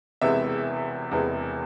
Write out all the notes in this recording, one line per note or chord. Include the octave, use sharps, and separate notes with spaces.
E1 E2 C3 G#3 B3 E5
E1 E2 C3 G#3 B3